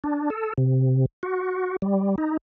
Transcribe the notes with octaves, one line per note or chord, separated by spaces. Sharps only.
D4
A4
C3
F#4
G3
D#4